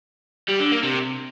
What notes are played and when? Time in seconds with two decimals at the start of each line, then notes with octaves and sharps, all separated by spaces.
0.49 G3
0.60 D3
0.72 A#3
0.83 C3